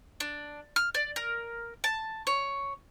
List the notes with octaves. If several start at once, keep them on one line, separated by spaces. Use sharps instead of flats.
D4
F6
D5
A#4
A5
C#5